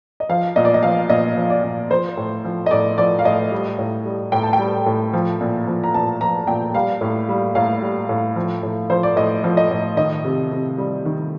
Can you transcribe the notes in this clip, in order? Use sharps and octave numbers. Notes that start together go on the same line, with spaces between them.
D#5
F3 F5
A#2 D#5
D5
D#5
F3 F5
A#2 D#5
F3
D5
A#2
F3 C5
A2
F3
D#5
A2 D5
F3 D5
F5
A2 D#5
G3
A2
G3
A2 G5
A5
G5
G3
A2
F3
A#2
F3
A#5
A#2 A5
F3 A#5
A#2 G5
G3 F5
A2
G3
A2 F5
G3
A2
F3
A2
F3 C5
D5
A2 D#5
F3
D#5
A2
D#3 D#5
C3
C3
G3
D#3